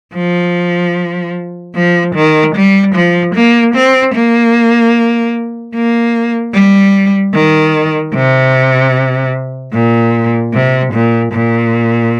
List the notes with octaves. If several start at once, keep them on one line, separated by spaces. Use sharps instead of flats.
F3
F3
D#3
G3
F3
A#3
C4
A#3
A#3
G3
D#3
C3
A#2
C3
A#2
A#2